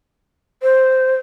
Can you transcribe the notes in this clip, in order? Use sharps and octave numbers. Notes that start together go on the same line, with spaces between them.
C5